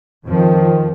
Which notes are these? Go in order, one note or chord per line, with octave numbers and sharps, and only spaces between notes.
F2 D#3 F3